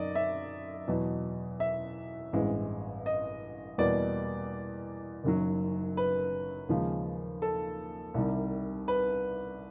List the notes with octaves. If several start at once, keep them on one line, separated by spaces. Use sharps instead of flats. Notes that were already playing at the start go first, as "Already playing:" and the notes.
Already playing: F#2 D#3 D5 D#5
E5
E2 B2 F#3
E5
A1 G2 E3 G#3 C4
D#5
E2 B2 G3 A#3 D5
F#1 F#2 D#3 F#3
B4
D#2 C#3 F3 G#3
A4
C2 C3 D#3 G3
B4